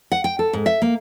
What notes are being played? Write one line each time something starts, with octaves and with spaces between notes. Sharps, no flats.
F#5
G5
A4
G#2
E5
A#3